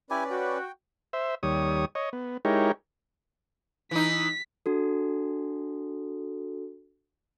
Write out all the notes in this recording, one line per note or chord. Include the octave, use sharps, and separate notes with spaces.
C#4 E4 G4 B4 D5 G#5
F#4 G5
C5 E5
D#2 G3 C#5 D#6
C#5 D#5
B3
G#3 D#4 E4 G4 A#4 C#5
E3 D#4 B6
D4 F#4 A4